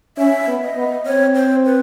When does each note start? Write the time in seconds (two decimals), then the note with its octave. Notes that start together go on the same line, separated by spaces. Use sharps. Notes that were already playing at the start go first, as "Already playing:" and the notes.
0.18 C#4 E5
0.47 B3
0.63 D#5
0.77 B3
1.06 C4 C#5
1.35 C5
1.65 B4